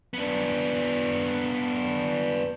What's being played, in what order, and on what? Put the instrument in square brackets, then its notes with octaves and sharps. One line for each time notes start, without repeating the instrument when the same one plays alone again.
[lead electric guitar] B3 D4